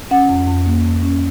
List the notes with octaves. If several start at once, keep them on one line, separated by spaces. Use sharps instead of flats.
C#4 F#5
F2
F2
A#3
F2
C#4